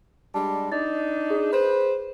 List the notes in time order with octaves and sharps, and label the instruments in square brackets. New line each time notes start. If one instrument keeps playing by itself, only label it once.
[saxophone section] G3 G#3 D4 [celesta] A5
[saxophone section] D4 D#4 [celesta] A6
[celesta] G#4
[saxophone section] B4 C5